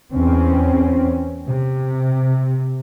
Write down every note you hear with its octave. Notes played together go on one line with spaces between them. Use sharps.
E2 C4 C#4
C3